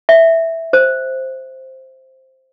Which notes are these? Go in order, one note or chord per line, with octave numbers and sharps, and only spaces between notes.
E5
C5